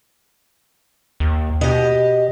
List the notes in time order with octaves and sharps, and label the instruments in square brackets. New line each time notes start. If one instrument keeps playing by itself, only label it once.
[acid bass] D#2
[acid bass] B2 [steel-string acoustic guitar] G4 D#5